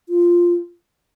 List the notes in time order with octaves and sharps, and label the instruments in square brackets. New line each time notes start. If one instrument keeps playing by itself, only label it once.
[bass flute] F4